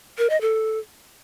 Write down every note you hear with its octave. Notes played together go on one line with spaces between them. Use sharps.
A#4
D#5
A4